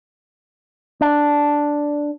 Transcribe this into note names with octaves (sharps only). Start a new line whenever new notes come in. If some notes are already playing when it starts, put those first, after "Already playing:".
D4